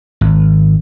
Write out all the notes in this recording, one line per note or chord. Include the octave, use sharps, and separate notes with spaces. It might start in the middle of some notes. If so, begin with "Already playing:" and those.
G#1